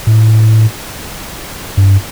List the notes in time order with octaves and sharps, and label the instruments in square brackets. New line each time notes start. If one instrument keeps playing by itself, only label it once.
[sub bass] A2
G2